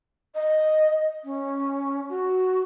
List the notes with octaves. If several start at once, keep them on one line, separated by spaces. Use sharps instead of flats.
D#5
C#4
F#4